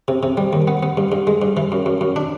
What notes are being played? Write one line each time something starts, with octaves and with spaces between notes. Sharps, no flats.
C3
C3
G3
D#2
B3
B3
G2
G2
G#3
G2
E3
F#2
F#2
F#2
D4